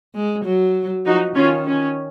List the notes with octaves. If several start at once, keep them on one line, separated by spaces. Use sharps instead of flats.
G#3
F#3
F3 D#4 F#4
D#3 C#4 F4
C#4